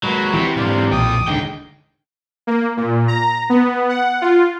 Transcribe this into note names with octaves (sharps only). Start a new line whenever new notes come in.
F#3 G#3 A#3 F#4 B4
C3 E3 G4
G#2 D3 C5 D5 F5
B1 F2 A#2 G5 D6 D#6
D1 D3 D#3 G#3 G5
A#3
A#2
A#5
B3
F#5
F4